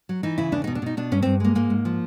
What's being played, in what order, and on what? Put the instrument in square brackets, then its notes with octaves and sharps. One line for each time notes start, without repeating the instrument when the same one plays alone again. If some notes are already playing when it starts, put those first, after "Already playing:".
[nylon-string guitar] F#3
E3 D#4
C#3 E4
E2 D4
B2 D#4
D4
B2 D#4
B2 D4
G2 C#4
G2 C4
G#3 A#3
G#2 A#3
G#2
F3